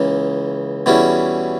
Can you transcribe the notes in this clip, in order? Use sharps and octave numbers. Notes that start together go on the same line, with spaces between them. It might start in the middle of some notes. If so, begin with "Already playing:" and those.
Already playing: C#2 C#3 E3 A#3
E2 B2 G3 C#4 E4